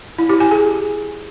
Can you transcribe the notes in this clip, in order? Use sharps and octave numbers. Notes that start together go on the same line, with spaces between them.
E4
G4
G#5
G#4